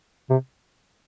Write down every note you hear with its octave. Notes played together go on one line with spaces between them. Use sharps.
C3